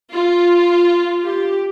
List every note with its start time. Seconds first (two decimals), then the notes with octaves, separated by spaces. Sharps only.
0.12 F4
1.25 G4